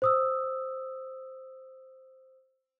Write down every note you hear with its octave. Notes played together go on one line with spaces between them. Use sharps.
C5 D#6 E6